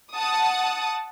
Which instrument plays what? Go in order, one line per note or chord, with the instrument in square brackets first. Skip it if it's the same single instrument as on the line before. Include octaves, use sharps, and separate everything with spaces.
[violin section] F#5 A5 D#6